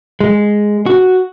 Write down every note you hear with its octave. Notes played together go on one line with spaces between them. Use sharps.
G#3
F#4